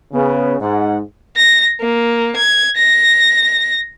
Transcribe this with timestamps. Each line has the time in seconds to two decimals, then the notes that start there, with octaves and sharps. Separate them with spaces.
0.13 C#3 B3
0.61 G#2 F#5
1.37 A#6
1.81 A#3
2.37 G#6
2.77 A#6